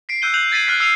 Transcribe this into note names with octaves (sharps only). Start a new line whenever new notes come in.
B6 C7 D7
E6 F#6 G6 D#7 G7
F#6 G6 C7 F7 F#7
G#6 A6 B6 C7 D#7 F#7
F6 F#6 A6 B6
E6 F6 C7 D#7 F7